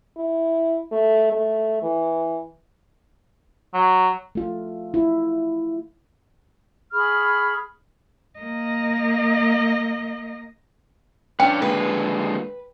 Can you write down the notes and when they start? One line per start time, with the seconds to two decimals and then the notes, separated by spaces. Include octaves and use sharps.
0.17 E4
0.92 A3
1.32 A3
1.83 E3
3.74 F#3
4.35 A3 F4
4.94 E4
6.92 G#4 B5 C#6 F6
8.39 A#3 D#5
11.40 C#4 D4 B4 G5
11.62 D3 G#3 A#3 B4